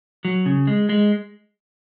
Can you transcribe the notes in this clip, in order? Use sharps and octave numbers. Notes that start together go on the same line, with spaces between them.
F#3
C#3
G#3
G#3